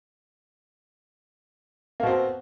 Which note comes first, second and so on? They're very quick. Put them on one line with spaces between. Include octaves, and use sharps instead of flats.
A#3 B2 C4